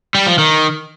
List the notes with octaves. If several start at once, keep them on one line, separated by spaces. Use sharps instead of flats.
G3
F3
D#3